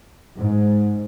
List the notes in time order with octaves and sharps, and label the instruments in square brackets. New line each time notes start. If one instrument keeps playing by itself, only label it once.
[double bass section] G#2